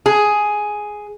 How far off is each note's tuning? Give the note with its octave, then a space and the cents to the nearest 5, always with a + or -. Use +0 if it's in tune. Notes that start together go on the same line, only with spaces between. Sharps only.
G#4 +5